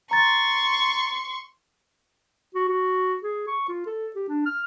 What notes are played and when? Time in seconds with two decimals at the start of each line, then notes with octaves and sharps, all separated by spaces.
0.11 A#5 C6 C#6 A6
2.55 F#4
2.68 F#4
3.23 G#4
3.47 C#6
3.68 F4
3.86 A4
4.15 G4
4.28 D4
4.46 F6